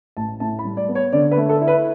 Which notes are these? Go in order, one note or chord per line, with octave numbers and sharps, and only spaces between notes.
A1 A5
A2 A5
B5
G3
D5
B3
C#5
D3 D5
B4
A3
A4
E4
B4